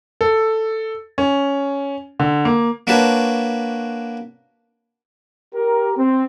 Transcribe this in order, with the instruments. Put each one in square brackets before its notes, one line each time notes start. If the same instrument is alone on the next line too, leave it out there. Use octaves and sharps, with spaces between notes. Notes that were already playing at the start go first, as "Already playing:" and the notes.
[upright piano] A4
C#4
D3
A#3
[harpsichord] A#3 D4 F#4 B4 C#5 A5
[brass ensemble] G4 A#4
C4